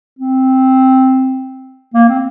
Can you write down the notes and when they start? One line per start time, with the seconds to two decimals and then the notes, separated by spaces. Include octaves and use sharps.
0.19 C4
1.94 A#3
2.08 C4